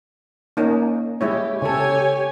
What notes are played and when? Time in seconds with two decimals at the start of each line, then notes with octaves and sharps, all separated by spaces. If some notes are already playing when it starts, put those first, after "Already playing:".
0.57 A#3 C#4 D#4
1.21 G#3 E4 G4 C#5
1.62 C#3 G4 A4 C#5 G#5